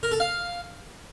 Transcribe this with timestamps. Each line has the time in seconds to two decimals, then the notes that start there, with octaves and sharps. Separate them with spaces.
0.03 A#4
0.12 A4
0.20 F5